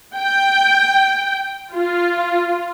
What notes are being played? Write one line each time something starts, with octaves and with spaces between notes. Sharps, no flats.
G5
F4